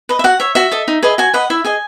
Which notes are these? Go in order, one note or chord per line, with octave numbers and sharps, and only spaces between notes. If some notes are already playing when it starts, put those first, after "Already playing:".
B4 D#5
E5
F#4 F#5
C#5 E5
F#4 E5
A4 D#5
D#4
G#4 B4 D#5
F#4 G#5
B4 D#5 F#5
E4 E5
G#4 D#5 G#5